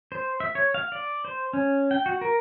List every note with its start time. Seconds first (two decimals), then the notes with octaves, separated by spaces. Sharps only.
0.12 C5
0.40 E5
0.55 C#5
0.74 F5
0.92 D5
1.25 C5
1.53 C#4
1.91 G5
2.06 F#4
2.21 A#4